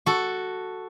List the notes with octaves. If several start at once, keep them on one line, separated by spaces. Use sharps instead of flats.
F#4 A4